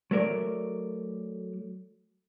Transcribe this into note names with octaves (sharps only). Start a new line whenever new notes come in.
F#3 A3 A#4 D5